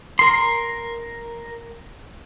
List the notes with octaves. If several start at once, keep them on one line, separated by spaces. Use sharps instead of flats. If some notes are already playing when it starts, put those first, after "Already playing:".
A#4 C6